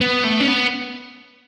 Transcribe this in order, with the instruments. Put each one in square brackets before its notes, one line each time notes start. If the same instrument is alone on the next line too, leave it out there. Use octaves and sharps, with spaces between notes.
[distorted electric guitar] B3
A3
C#4
B3